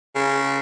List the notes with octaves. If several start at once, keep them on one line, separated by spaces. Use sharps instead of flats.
C#3